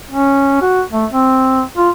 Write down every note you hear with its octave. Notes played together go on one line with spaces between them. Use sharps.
C#4
F#4
A3
C4
F4